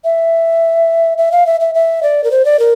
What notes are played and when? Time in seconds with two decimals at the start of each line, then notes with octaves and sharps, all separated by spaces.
0.04 E5
1.18 E5
1.32 F5
1.46 E5
1.60 E5
1.75 E5
2.03 D5
2.24 A#4
2.31 C5
2.45 D5
2.59 A#4